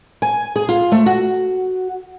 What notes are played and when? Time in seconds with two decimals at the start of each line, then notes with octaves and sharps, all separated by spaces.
0.22 G#5
0.56 G#4
0.69 F4
0.92 A3
1.06 F#4